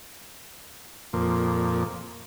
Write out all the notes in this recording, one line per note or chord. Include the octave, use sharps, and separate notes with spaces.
F2 A#2